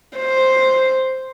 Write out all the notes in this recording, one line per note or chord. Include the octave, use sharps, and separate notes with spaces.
C5